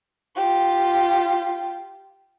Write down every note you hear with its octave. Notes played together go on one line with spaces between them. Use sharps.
F4 G4